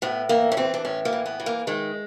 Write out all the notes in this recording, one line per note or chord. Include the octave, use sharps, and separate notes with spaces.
A2 B3
E3 A#3
C#4
E3 C4
D4
A2 C#4
A#3
E3
B3
E3
A#3
D#3 G#3